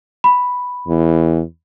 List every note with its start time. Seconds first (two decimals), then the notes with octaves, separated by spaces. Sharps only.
0.24 B5
0.88 E2